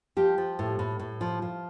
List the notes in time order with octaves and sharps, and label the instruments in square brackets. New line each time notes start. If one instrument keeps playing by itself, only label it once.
[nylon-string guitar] F3 G4
F3
A2
A2
A2
F3
F3